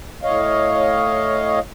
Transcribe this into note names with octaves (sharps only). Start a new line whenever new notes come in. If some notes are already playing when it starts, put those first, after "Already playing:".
A2 C#5 D#5 F5